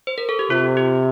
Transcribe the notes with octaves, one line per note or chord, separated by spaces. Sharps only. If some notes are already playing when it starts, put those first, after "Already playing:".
C5
A#4
A4
G4
C3 F4
G4